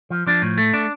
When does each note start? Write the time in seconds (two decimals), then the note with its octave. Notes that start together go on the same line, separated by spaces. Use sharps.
0.10 F3
0.27 F3 D4
0.42 A2
0.58 A3
0.74 D4